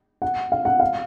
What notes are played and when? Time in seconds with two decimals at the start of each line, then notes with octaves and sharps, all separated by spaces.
0.22 F#5
0.52 F5
0.65 F#5
0.80 F5